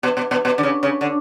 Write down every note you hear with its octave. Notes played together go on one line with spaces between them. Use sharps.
B2
B2
B2
B2
D3
C#3
C#3
D3